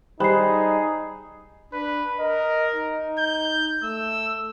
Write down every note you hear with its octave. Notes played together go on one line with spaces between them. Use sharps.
G3 D#4 G#4 C5 B5 F#6 C7
D4 B4
A#4 D#5
D#4
G6
A3 E6